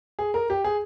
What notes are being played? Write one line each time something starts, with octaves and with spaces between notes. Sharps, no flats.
G#4
A#4
G4
G#4